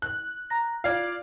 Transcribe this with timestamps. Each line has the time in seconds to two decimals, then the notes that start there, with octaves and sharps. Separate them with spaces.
0.02 F#6
0.50 A#5 A#6
0.84 F4 D5 F5 G#6